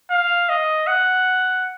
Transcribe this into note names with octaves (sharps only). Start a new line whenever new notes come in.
F5
D#5
F#5